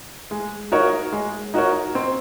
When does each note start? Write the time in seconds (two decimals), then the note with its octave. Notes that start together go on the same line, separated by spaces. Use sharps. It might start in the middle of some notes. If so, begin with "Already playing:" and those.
0.31 G#3
0.72 D#4 F#4 A#4 C#5
1.12 G#3
1.54 D#4 F#4 A#4 C#5
1.95 C4